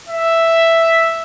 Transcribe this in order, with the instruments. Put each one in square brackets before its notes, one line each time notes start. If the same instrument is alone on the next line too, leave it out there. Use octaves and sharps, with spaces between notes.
[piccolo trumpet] E5